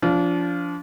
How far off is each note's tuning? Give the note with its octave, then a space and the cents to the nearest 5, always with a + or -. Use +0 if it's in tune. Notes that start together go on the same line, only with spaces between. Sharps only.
F3 -5 D4 -30